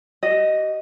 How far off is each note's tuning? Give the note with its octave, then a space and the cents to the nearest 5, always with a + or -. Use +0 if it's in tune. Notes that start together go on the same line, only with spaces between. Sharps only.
G4 -45 D#5 +0